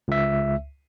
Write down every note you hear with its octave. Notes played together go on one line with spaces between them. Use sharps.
C#2 E5